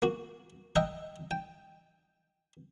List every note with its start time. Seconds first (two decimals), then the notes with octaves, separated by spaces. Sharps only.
0.02 A#3 F#4
0.76 D#5 E5 F#5 G5 A#5
1.31 G5